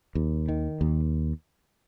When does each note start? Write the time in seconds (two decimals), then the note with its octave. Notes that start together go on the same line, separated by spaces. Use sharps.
0.15 D#2
0.48 D#3
0.81 D#2